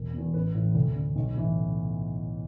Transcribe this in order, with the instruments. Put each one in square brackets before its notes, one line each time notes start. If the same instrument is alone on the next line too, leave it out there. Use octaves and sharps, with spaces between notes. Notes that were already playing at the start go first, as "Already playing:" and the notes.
Already playing: [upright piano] E1
E2 B2
A1 B4
A2 E3
D2
D3
B1
A2 E3